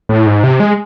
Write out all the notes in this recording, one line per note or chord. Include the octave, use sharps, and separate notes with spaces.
A2
G#2
C3
G#3